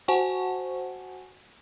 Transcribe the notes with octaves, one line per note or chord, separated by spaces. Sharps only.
F#4 C5 F#5 G#5 A5 C#6